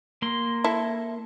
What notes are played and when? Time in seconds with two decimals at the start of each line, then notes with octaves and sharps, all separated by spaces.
0.22 A#3 C6
0.64 E4 A4